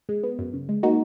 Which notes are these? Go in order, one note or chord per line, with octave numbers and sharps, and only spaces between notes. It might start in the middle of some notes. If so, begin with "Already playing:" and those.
G#3
B3
F#2
C#3
G#3
A#3 D#4 F#4